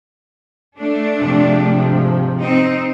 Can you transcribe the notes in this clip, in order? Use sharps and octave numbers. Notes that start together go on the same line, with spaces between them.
A3 D4
G#2 C3 F3
C4 D#4